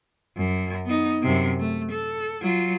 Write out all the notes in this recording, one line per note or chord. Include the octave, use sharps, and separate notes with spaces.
F#2
B3 D#4
F#2 C3
A3
A4
F#3 F4